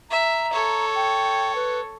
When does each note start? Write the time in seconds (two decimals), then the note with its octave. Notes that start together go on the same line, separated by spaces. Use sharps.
0.10 E5 A#5
0.52 A4 C#5
0.95 G5
1.55 B4